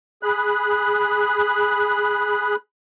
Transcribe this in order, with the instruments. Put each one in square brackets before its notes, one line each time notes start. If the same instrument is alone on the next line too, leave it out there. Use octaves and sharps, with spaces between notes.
[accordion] G#4 B5 F#6